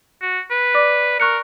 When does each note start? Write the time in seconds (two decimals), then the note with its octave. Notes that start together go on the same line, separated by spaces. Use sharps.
0.22 F#4
0.51 B4
0.74 D5 D6
1.20 A#4 C#6 F#6 C#7